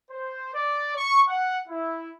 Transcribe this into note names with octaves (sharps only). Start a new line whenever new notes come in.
C5
D5
C#6
F#5
E4